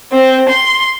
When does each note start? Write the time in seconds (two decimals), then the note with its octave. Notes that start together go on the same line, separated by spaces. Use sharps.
0.12 C4
0.48 C6